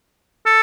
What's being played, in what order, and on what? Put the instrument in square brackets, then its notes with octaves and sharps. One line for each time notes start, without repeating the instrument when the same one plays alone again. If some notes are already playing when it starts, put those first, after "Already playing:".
[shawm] A4